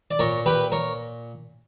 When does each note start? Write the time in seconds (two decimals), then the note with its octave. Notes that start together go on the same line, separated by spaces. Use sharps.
0.11 D5
0.19 A#2 A#4 C#5
0.46 G4 B4
0.72 A#4 C#5